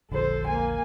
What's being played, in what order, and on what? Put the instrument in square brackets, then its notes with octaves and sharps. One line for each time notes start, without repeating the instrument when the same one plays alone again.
[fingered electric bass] E1 A#1 D3 [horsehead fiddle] A4 C5
[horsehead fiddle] A#3 G#5